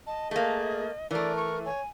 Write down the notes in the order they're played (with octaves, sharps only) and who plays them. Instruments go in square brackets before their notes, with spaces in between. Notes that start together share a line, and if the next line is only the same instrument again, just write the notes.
[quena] D#5 [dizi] A5
[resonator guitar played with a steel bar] A3 A#3 [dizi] G#4
[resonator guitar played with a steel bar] E3 A3 [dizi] A#4 [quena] D5
[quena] C#6
[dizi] C#5 [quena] G#5